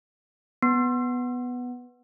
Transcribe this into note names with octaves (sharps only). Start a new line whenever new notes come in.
B3